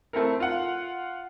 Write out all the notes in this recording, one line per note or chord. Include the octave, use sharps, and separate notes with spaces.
A3 C4 E4 A4 A#4
F4 F#5